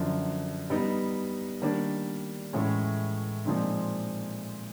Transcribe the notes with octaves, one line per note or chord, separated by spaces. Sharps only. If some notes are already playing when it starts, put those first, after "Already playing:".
Already playing: F#2 D3 F3
G3 B3 D#4
D#3 G3 A#3 D4
A2 E3 G#3 C#4
A#2 F3 G#3 C4 D#4